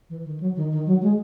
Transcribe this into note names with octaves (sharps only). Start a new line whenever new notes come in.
E3
D#3
F#3
D#3
D#3
F#3
G#3